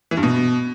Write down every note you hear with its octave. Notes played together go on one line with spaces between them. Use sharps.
E3
G2
B2